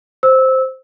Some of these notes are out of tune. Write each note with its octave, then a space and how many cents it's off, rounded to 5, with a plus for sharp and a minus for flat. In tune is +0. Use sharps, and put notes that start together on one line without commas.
C5 +0 E6 -15